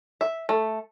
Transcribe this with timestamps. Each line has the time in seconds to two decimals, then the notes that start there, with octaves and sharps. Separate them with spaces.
0.21 E5
0.49 A3